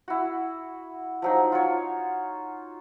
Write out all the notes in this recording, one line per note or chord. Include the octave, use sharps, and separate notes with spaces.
E4 F#4
F3 F#3 D#4
F4 F#4 C#5